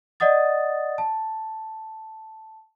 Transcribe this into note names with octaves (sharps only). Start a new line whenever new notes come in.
D5 D#5 F#5 D#6 A6
A5